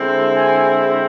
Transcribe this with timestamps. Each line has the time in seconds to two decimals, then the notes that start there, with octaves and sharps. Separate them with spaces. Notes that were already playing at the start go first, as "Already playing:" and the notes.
Already playing: D3 G#3 C4 E4
0.36 G#5